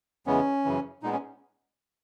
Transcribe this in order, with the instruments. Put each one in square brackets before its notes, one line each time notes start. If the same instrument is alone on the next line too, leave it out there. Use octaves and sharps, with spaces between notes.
[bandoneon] E2 C#3 E3 G#3 B3 C#4
F#2 C#3 E3
A#2 G#3 B3 D#4
C#4